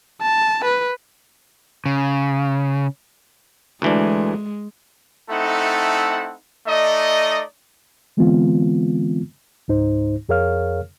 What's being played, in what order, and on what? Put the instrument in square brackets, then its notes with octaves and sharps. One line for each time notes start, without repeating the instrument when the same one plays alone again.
[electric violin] A5
B4
[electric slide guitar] C#3
[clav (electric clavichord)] D2 E3 D4 [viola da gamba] G#3
[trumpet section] A3 C4 D#4 E4 A4 F#5
A3 D#4 D5 D#5
[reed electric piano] D3 E3 G#3 B3 C4 F4
C#2 G#2 D#4 C5
F2 G#4 A#4 C#5 F5 F6